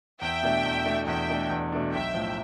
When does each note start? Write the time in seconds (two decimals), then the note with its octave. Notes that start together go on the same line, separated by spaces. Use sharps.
0.21 E2 E5 G5
0.43 B2 A3 D4
0.65 E2
0.85 B2 A3 D4
1.07 E2 E5 G5
1.29 B2 A3 D4
1.50 E2
1.72 B2 A3 D4
1.93 B1 E5 G5
2.14 A2 F3